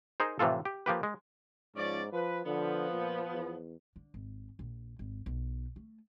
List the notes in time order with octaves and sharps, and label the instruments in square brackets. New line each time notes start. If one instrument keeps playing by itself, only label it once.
[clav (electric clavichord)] D#4 G#4 A#4 C5
A2 C3 E3 F3 F4 A4
G4
F3 A#3 G4 B4
G#3
[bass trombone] G#2 [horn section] F3 C#4 D5
[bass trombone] F3 [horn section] B4
[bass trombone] D3 [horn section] F3 B3
[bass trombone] A#2
E2
[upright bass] D3
G#1
A#1
G#1
B1
A3